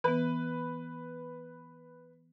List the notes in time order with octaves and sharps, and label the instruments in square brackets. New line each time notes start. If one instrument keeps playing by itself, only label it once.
[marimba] E3 B3 [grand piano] B4